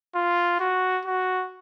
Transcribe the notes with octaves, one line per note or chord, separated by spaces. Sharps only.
F4
F#4
F#4